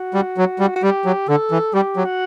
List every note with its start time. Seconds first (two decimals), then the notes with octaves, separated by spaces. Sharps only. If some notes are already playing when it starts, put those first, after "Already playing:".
Already playing: F#4
0.14 G3
0.38 F#3
0.59 G3
0.76 F#4
0.83 G3 G4
1.05 F#3
1.28 D3 A4
1.51 E3
1.74 G3 G4
1.97 F#3
2.05 F#4